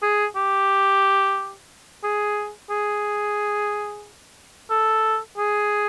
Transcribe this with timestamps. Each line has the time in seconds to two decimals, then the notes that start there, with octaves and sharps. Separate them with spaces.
0.02 G#4
0.36 G4
2.04 G#4
2.70 G#4
4.71 A4
5.38 G#4